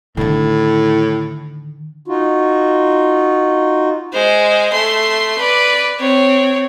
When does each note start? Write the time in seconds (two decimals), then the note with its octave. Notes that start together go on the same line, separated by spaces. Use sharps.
0.17 A2 D3 D#3
2.06 D#4 F4 F#4
4.13 G#3 C5
4.73 A3 C6
5.38 B4 D5
5.99 C4 C#5